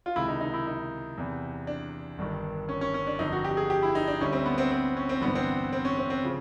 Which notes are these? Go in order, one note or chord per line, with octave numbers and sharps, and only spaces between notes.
F4
C#2 C3 D#3 G#3 E4
D#4
D#4
E4
D#4
E2 C3 E3
D4
G1 G2 D#3
C#4
C#4
C#4
D4
G1 F2 D3 D#4
F#4
G4
G#4
G4
E4
D#4
D4
D2 D3 G3 C#4
C4
B3
C4
C4
C#4
C4
A1 G2 D3 B3
C4
C4
C#4
C4
C4
C#3 F3